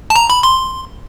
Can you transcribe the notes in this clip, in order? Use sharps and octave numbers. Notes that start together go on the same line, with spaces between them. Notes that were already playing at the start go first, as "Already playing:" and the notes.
A5
A#5
B5
C6